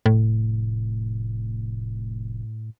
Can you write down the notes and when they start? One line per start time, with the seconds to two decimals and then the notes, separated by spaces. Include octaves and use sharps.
0.06 F1 A2